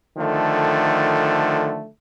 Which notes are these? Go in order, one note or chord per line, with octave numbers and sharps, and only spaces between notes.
D3 D#3 F3 A3